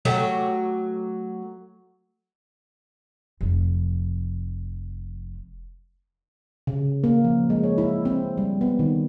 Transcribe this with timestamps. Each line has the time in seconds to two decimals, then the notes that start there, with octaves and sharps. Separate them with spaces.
0.05 F#3 A3 G4
3.41 F1 F3
6.67 C#3
7.04 A#3
7.24 F3
7.50 G#3
7.63 C#5
7.78 E4
8.05 C4
8.37 G3
8.61 B3
8.79 D#3